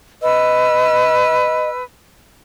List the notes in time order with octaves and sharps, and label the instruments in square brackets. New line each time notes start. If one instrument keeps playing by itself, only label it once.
[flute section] B4 E6 [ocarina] D#5